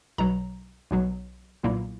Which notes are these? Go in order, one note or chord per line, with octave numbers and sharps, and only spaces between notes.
B1 B2 F#3 A#5
B1 B2 F#3
B1 A#2 A#3 E4